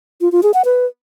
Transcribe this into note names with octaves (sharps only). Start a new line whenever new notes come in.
F4
F4
G#4
F#5
B4